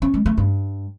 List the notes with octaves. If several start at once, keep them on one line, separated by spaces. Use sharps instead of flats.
C#4
G#3
A3
G2